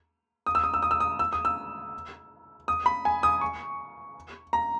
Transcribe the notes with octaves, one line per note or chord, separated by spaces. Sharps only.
D#6
E6
D#6
E6
D#6
E6
D#6
E6
D#6
E6
D#6
B5
G#5
D#6
C#6
A#5